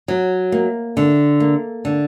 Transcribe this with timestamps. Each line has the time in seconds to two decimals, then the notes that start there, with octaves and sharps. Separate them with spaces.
0.08 F#3
0.52 A#3
0.97 D3
1.40 A#3
1.85 D3